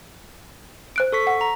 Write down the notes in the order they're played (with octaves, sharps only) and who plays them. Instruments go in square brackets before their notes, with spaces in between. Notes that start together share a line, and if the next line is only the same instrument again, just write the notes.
[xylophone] C5 F#6 D7
[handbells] A4 C#6 B6
[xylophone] F#5
[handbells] A#5